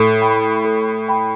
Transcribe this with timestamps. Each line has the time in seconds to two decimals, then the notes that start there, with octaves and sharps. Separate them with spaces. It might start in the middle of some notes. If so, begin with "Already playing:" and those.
Already playing: A2 A4
0.21 G5 B5
0.64 A4
1.09 G5 B5